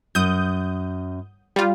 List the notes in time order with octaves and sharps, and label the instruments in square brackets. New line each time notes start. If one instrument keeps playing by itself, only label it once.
[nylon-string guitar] F#2 [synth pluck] D#6 G6
[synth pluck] G3 F4